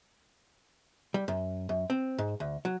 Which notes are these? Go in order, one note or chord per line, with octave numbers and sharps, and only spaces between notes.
G3
F#2
F#2
C4
G#2
D2
F#3